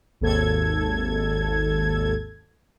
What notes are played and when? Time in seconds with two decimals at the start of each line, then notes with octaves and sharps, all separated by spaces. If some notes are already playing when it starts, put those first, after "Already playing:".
0.21 G#1 D#2 A4 G#6